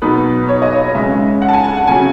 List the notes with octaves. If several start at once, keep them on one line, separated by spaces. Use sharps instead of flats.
B2 F#3 B3 D#4 B4
C#5
D#5
C#5
C#3 G#3 C#4 E5
F#5
A5
G#5
A5
F#5
C#3 F#3 C#4 G#5